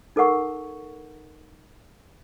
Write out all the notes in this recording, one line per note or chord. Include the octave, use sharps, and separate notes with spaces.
D#4 A4 A#4 F#5 C#6